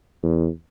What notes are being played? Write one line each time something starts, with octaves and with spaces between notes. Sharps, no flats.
E2